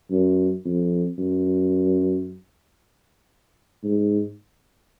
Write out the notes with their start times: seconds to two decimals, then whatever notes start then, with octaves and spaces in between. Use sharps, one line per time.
0.11 F#2
0.65 F2
1.19 F#2
3.84 G#2